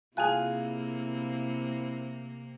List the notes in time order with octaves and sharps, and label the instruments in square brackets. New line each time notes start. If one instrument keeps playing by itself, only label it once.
[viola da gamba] C3 A#3 C4 [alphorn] E4 [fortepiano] F4 G#5 [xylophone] G#4 F#6